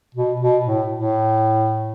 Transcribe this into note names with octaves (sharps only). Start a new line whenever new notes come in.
B2
B2
A2
A2